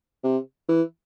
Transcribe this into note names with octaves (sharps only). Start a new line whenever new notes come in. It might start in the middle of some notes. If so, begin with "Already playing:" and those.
C3
E3